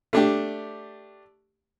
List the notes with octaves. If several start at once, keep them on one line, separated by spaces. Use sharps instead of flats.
A3 D4 G4